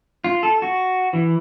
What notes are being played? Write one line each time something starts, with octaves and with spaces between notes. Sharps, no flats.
F4
A4
F#4
E3